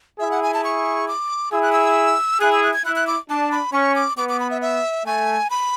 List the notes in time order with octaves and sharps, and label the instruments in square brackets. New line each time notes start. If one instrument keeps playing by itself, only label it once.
[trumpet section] E4 G#4 [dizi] E5
[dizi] F#5
G#5
A5
C#6
D6
[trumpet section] E4 G#4 [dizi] E6
[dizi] F#6
E6
[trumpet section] E4 G#4 [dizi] F#6
[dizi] E6
F#6
G#6
[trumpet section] E4 [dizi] F#6
[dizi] F#6
D6
[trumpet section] D4 [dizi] A5
[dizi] B5
[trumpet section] C#4 [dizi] C#6
[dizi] D6
[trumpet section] B3 [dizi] D6
[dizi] D6
B5
E5
E5
[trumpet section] A3 [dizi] G#5
[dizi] B5